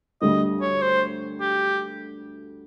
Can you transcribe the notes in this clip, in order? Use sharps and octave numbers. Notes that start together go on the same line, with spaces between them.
D2 D3 G3 D#5
C#5
C5
G4